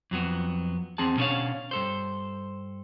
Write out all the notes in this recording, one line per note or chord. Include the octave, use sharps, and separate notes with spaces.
F2 F#3 B3
E2 C4 G#4 A5
B2 C#4 D4 A#4 C#5 F5
G2 A4 C5